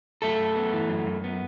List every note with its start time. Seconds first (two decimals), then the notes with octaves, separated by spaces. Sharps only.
0.22 F#2 A3 A4
0.39 F#2
0.56 B3
0.73 E3
0.89 F#2
1.06 F#2
1.24 B3